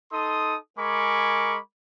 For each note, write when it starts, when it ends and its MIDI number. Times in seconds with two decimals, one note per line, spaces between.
0.12 0.56 63
0.12 0.56 69
0.12 0.56 84
0.12 0.56 87
0.78 1.58 56
0.78 1.58 70
0.78 1.58 80
0.78 1.58 83
0.78 1.58 85
0.78 1.58 86